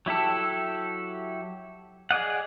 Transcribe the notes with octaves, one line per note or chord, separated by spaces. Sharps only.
F#3 E4 G4 A4
G#4 D5 D#5 F#5